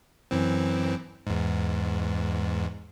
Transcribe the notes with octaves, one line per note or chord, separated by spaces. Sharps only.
F#2 E3 C4
E2 G#2